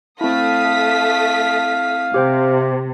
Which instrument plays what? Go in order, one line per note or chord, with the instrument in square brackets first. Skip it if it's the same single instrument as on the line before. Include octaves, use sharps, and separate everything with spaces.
[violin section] A3 D#6 B6 [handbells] C4 E4 [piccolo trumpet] F5
[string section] C3 [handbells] G4 C5 G5